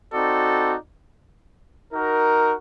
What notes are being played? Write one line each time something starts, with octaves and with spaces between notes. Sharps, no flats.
C4 D#4 F#4 A4 D5
D#4 F#4 A#4